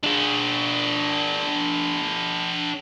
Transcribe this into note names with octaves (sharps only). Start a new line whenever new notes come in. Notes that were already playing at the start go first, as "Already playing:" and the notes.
D4 G#4